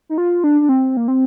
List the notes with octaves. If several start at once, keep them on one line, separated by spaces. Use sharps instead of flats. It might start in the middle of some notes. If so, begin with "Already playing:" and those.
D#4
F4
D4
D4
C4
A#3
C4